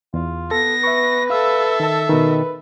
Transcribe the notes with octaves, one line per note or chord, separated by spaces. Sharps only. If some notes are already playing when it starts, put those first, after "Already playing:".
E2 F4
B3 A4 A#6
B4 E5 C#6
A4 E5 F5 E6
D#3 A5
B2 D#3 B4